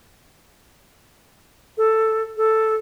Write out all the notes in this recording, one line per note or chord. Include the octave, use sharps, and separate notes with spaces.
A4
A4